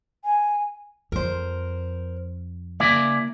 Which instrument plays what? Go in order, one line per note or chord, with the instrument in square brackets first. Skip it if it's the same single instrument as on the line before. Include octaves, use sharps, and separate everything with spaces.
[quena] G#5
[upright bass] F2 [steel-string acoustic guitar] A#4 C5
[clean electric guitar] C#3 E4 D5 [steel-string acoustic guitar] A#3